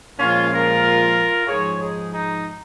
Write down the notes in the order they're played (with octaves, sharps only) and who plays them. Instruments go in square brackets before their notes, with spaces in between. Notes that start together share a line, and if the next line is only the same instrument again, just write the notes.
[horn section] A#2 F3 G#3 C#4 F4
F4 A#4
G#2 F3 G#3 G#4 C#5
D#4 G#4
D#4